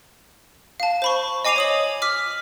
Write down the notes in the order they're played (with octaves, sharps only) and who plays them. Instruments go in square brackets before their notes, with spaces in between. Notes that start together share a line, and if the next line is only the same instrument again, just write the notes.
[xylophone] F5 A5
C5 B5 C#6
D#5 G#5 D6 C7 D#7 F7
C#5 D#6 F#7
D6 F6 B6